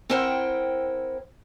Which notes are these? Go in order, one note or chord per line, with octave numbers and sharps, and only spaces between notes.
C4 E4 A#4 C5 F#5 G5